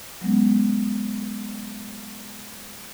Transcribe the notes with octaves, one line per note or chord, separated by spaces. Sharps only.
F#3 G#3 B3 C#4